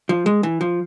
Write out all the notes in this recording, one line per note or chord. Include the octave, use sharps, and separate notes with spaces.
F3
G#3
E3
F3